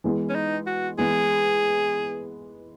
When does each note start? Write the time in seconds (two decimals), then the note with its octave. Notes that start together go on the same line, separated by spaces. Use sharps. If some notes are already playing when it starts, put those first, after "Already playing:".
0.04 E3 G#3 B3
0.29 C#4
0.35 D#4
0.67 F#4
0.98 E3 G#3 B3 G#4